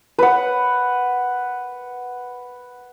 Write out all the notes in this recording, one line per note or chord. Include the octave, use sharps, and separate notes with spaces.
B4 F#5